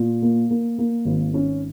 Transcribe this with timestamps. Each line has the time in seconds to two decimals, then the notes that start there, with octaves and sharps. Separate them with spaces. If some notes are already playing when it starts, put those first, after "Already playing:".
Already playing: A#2
0.22 A#3
0.50 A#3
0.78 A#3
1.05 G#1
1.34 C#4